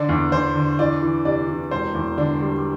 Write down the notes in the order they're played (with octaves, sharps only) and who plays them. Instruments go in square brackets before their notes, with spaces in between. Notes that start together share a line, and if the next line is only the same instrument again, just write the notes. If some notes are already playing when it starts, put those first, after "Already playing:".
Already playing: [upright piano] D3 D5
E2
E2 C5
D3
E3 D5
E3
C3 D5
E3
E1 C5
E2
D3 D4
G3